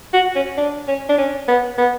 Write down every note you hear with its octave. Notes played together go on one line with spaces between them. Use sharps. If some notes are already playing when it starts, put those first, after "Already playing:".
F#4
C#4
D4
C#4
D4
C#4
B3
B3